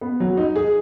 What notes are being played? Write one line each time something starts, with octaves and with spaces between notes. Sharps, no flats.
B3
F#3
D#4
G#4